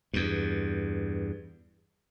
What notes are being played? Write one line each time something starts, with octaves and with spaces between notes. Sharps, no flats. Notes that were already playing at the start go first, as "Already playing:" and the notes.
E2 G2